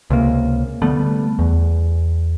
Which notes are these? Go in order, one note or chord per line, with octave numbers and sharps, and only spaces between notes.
C#2 C3 A#3
D3 G3 A3 B3
E2